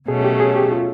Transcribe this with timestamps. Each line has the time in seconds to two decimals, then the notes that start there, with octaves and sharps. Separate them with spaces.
0.08 B2 F#3 A3 C#4 G#4
0.24 G4
0.40 G#4
0.56 G4
0.71 F4